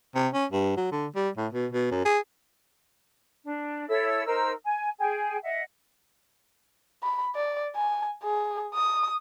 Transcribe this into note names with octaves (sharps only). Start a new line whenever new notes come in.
C3
C#4
G2
F#3
D3
G3
A2
B2
B2
F#2
G#4
D4
E4 A4 C#5 E6
D#4 A#4 C5 E6
G#5
G#4 G5 G#5
D#5 E5 F#5
B5
D5
G#5
G#4
D#6